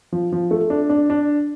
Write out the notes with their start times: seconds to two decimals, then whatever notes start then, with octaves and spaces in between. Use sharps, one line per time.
0.12 F3
0.32 F3
0.51 A3
0.70 D4
0.90 D4
1.10 D4